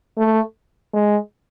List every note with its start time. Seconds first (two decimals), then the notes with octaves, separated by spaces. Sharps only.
0.17 A3
0.93 G#3